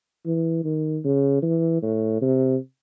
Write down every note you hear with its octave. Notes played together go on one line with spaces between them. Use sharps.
E3
D#3
C#3
E3
A2
C3